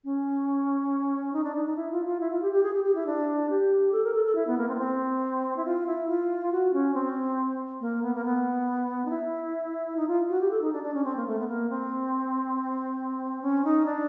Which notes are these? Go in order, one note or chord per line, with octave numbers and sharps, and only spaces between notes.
C#4
D#4
D4
D#4
D#4
E4
F4
F4
E4
F4
G4
G4
G#4
G4
G4
E4
D4
G4
A4
A#4
A4
A4
E4
B3
A#3
C4
B3
C4
E4
F4
E4
F4
F#4
C#4
C4
A#3
B3
A#3
B3
D#4
E4
D#4
F4
F#4
G4
A4
D#4
D4
D4
C#4
C4
A#3
A3
B3
A#3
C4
C#4
D#4
D4